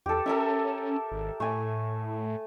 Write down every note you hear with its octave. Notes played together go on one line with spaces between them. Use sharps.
E2 G4 A4
C#4 A4 A#4 E5
G#1
A2 A3 G#5